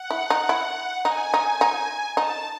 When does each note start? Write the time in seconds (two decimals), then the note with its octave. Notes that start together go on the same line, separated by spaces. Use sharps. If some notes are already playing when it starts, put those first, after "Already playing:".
Already playing: F#5
0.10 E4
0.30 D#4
0.49 E4
1.04 D#4 G#5
1.34 D#4
1.61 D#4
2.17 D#4 A5